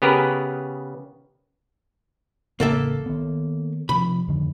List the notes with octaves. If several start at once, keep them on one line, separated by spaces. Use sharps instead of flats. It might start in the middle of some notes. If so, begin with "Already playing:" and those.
C#3 B3 G4 G#4 A#4 B4
A1 C#3 A#3 A4 E5
D#3 B3
C3 F3 B5
F2 D3 D#3